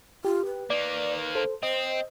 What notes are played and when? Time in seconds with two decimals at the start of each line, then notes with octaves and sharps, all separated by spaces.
0.25 F4 G4
0.45 B4
0.70 D#3 A#3 D5
1.35 A4 C5
1.63 C4 C5 D#5